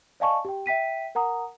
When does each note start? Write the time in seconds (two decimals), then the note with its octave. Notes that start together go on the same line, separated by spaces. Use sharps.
0.20 D5 D#5 F5 G#5 A5 C#6
0.45 G4 G5
0.66 E5 G5 B6 D#7
1.15 A#4 F#5 A#5 D#6